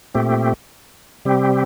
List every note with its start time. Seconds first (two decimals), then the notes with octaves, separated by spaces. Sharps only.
0.14 A#2 A3 C4 G4
1.25 C3 G3 C4 G4